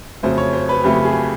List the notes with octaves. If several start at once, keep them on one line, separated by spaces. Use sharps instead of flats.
F2 C#3 F#3 A3 C5
C#5
C5
B4
F2 C#3 F#3 A3 G4
G#4